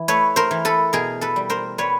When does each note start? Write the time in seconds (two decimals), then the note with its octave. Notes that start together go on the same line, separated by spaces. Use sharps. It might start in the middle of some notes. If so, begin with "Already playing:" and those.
Already playing: E3
0.08 A3 B4 C#5
0.36 A#4 C5
0.51 E3
0.65 A4 B4
0.93 B2 G#4 A#4
1.21 A4 B4
1.36 G3
1.50 A#4 C5
1.78 G3 B4 C#5